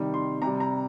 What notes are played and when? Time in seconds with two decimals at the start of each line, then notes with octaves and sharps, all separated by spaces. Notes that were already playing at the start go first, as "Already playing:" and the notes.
Already playing: C3 D#3 G3
0.14 C6
0.42 C3 G3 A#5
0.60 A#5